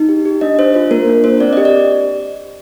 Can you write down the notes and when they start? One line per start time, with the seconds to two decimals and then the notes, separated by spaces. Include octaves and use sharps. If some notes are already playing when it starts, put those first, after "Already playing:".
Already playing: D#4
0.09 G4
0.25 G4
0.41 D4 D#5
0.59 D4 C5
0.74 F4 C5
0.91 A#3 A#4
1.08 D4
1.24 D4 C5
1.40 C4 D5
1.53 D#5
1.57 G4
1.65 D5